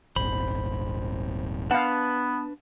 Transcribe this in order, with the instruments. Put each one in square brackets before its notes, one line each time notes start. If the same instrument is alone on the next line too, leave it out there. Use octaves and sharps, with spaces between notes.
[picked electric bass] D#1 G#1 [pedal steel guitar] C5 B5
[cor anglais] B3 [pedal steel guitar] D4 B4 A5 [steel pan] F5 F#5